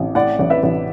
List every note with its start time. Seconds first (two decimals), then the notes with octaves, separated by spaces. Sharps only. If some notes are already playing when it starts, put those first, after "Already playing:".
Already playing: A1
0.15 A2 D5 F#5
0.39 A1
0.50 B4 E5
0.63 A1